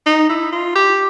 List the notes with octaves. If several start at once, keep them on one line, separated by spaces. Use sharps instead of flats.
D#4
E4
F4
G4